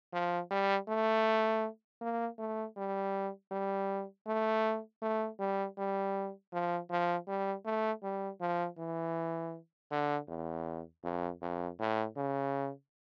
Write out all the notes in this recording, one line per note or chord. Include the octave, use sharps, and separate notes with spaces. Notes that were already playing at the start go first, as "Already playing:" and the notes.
F3
G3
A3
A#3
A3
G3
G3
A3
A3
G3
G3
F3
F3
G3
A3
G3
F3
E3
D3
E2
F2
F2
A2
C#3